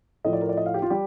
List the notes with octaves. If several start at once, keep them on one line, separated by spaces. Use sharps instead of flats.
A2 F3 A3 D#5
D5
A#4
D5
D#5
F5
G4
F4
G3 G4